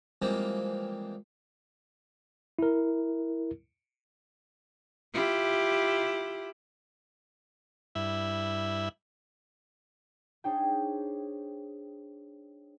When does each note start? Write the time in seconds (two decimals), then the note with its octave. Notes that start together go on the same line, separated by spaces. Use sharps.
0.22 E3 F3 G3 G#3 A#3 C4
2.59 E4 A#4
5.14 E4 F4 G4
7.95 G2 E4 E5
10.44 D4 D#4 G#4 C5 C#5 G5